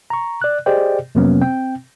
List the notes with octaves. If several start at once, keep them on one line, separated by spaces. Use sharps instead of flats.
A#5 C#6
D5 F#6
G4 G#4 C5 D5 D#5 G5
F2 C3 F#3 A#3 B3 C#4
C4 G5